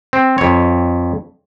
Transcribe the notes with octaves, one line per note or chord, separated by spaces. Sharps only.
C4
F2 C#5